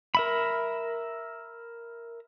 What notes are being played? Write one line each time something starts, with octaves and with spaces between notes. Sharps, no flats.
A#4 E5 B5